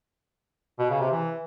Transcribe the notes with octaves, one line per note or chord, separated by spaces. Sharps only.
B2
C#3
C3
E3